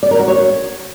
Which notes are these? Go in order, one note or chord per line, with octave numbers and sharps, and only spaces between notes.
D5
A#4
F#4
C#5